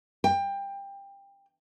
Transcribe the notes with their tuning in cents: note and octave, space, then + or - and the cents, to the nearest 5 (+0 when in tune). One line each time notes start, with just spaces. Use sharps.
G5 +20